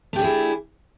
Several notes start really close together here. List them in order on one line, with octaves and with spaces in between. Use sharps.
A3 G4 D4 G#4 E4